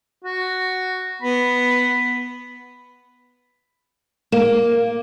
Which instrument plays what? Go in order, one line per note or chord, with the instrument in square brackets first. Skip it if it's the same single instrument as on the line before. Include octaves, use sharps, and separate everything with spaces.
[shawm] F#4
[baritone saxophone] B3 [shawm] B5
[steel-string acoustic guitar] A#3